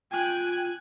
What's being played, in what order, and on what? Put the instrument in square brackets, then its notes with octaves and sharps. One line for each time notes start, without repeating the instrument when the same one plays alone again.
[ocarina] F4 [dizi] G5 [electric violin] G#5 F#6